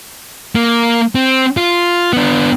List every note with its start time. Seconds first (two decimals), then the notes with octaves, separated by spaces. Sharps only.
0.55 A#3
1.15 C4
1.57 F4
2.13 B3 D4